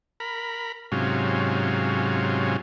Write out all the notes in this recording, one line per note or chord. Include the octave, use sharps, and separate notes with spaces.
A#4 B5
G#2 C3 F#3 C#4 F4